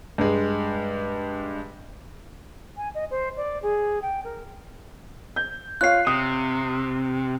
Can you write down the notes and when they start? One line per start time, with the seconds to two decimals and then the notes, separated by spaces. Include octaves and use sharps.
0.18 G2 G#3
2.77 G#5
2.94 D#5
3.10 C5
3.37 D5
3.62 G#4
4.02 G5
4.24 A#4
5.36 G6
5.81 F4 C#5 F5 F#6 C7
6.07 C3 D#6